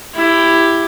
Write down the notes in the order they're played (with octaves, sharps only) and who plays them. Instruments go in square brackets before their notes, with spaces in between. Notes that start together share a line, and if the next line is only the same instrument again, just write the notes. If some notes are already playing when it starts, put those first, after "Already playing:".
[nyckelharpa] E4 G4